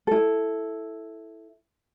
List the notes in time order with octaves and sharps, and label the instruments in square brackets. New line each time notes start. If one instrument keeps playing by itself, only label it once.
[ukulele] E4 A4